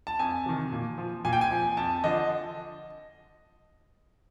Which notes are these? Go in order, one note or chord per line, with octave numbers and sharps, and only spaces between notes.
A5
F2 G#5
C3 D#3
A#2
F3
A#2 G#5
G5
G#5
F3
F2 A5
D3 F3 D#5